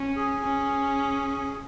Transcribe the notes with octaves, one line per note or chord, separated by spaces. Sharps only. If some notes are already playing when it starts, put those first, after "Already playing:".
Already playing: C#4
G#4
C#4